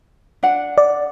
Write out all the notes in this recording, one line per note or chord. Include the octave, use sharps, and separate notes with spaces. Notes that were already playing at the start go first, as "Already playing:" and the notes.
D4 F#5
D5